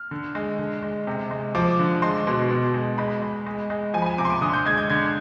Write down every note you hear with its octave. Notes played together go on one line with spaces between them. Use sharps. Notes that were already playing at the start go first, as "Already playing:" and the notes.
Already playing: F6
D3
G#3
D3
G#3
C3
G#3
F3 D6
D3
G#3 C6
B2
B2
G#3
G#3 B5
G#3
G#3
G#3
F3 G#5
B5
G#5
C3 D6
C6
D6
D3 D#6
G6
G#3 G#6
G6
D3 G#6